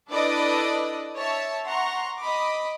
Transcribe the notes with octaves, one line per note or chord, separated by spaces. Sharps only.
D4 E4 A4 B4 D5 D#5
C#5 E5 A5
F#5 A#5 C6 C#6
D#5 B5 D6